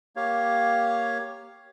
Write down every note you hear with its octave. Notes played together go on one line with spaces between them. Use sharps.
A#3 G4 C#5 F5